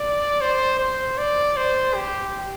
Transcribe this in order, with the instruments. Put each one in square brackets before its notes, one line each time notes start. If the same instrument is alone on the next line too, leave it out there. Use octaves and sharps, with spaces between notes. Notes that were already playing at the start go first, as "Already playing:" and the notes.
Already playing: [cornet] D5
C5
C5
D5
C5
G4